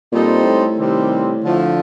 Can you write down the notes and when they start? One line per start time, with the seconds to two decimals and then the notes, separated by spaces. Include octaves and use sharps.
0.12 A#2 G3 C4 D#4 A4 C5
0.45 A2
0.78 C3 D#3 G3 C4
1.43 D3 F3 A3